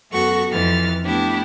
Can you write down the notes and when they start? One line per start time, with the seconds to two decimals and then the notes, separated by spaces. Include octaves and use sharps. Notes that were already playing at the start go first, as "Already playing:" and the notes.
0.10 F#2 B3 F#4 A4 F#5 C#6
0.50 F2 E3 F6 A6
1.04 A3 B3 D4 E4 G4